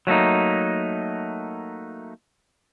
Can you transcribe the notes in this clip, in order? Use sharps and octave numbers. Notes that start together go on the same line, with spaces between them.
F#3 A3 A#3 D#4